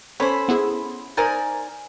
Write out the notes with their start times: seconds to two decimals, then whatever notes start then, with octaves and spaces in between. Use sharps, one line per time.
0.20 C#4 A4 C5 C#5 B5
0.49 B3 E4 G#4
1.17 D#4 A#4 C5 D5 G#5 A#5